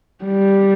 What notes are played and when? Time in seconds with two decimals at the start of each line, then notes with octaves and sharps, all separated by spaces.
0.25 G3